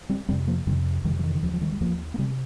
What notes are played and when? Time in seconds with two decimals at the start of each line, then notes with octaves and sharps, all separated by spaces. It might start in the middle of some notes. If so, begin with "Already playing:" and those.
0.09 G3 C4
0.28 F2 C3 G3 C4
0.47 F3 A#3
0.67 F2 C3 D#3 G3
1.04 F2 C3 D#3 G3
1.19 F3
1.24 D#3
1.35 D#3
1.43 D#2 F3
1.53 F3
1.61 D#3 G3
1.72 G3
1.81 D#2 F3 A#3
2.14 A#3
2.18 C3 G3 C4